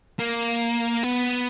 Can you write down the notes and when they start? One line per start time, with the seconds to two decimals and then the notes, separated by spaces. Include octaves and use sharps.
0.20 A#3
1.04 B3